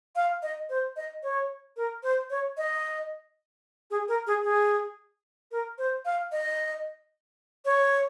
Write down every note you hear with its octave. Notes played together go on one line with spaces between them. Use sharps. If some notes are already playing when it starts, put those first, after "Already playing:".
F5
D#5
C5
D#5
C#5
A#4
C5
C#5
D#5
G#4
A#4
G#4
G#4
A#4
C5
F5
D#5
C#5